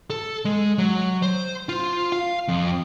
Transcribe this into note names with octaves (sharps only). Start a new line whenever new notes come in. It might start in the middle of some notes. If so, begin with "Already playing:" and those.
A4
G#3
F#3
C5
F4
F5
F2